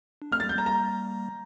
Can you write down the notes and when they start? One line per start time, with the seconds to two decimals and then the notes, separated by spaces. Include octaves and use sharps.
0.22 D4
0.32 A3 C4 F6
0.40 G3 A#3 A6
0.49 G6
0.55 G3 A#3 A#5
0.66 A#5